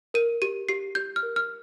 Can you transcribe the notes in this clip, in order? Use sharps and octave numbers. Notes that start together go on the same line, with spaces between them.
A#4 D#7
G4 D#7
G4 C7
G4 G6
F6
A#4
F6